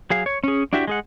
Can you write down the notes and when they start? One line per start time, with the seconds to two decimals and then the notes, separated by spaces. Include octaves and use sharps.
0.10 F#3 G#4 F5
0.26 C#5
0.44 C#4 G#4
0.73 D4 E4 F#4 G4 E5
0.88 G#3 G#4 F#5